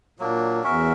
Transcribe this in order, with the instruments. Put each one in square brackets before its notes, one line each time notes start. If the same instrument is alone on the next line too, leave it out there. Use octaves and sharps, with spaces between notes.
[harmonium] A#2 [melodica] F#3 A#3 D4
[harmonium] E2 [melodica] C#4 F#4 A#4 E5